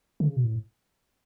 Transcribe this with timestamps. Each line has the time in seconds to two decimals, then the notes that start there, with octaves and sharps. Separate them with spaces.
0.20 D3
0.28 C#3
0.36 B2
0.44 A2